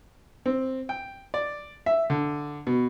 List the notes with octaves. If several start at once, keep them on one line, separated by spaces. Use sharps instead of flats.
C4
G5
D5
E5
D3
B2